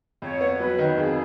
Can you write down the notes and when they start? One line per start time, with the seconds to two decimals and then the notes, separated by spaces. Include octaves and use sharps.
0.22 F2 C#5
0.41 B3
0.60 F#3 B4
0.79 D#3
0.98 F2 G#4